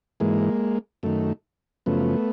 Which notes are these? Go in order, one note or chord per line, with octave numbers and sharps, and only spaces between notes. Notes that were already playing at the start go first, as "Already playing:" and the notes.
G#2 E3 G#3 A#3
F#2 D#3 A3
F#2 C#3 F3 A3 B3